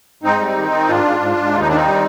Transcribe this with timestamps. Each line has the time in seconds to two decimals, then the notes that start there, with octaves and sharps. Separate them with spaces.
0.23 G#2 C4 D#4
0.40 G3
0.56 D#3
0.71 D#3
0.88 G#2 D4 F4
1.04 G#2
1.20 G#2
1.37 G#2
1.53 D#2 F4
1.60 D#4
1.69 D#3 D4
1.76 C4 D#4
1.85 G3